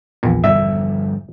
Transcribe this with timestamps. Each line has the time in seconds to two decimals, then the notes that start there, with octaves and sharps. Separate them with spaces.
0.23 A#1 E2 A#2
0.44 G2 D3 F3 E5